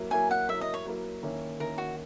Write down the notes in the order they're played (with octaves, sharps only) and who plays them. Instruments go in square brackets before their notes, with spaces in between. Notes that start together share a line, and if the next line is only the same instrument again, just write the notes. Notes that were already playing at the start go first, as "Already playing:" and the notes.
Already playing: [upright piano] F#3 A#3 E4
[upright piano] F#3 A#3 E4 [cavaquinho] G#5
[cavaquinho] F#5
[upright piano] F#3 A#3 E4 [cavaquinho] E5
[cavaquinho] D#5
C#5
[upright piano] F#3 A#3 E4
D#3 A#3 C#4 E4
[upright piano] D#3 A#3 C#4 E4 [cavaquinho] A#4
[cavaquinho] F#4